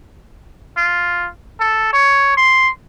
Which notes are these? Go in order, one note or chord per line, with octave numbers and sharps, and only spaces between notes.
F4
A4
C#5
C6